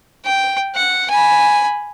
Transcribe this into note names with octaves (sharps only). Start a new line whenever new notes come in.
G5
F#5
G#5 B5